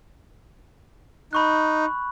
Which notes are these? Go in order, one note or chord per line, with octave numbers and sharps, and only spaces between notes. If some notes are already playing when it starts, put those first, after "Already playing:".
D#4 B5 C#6 F#6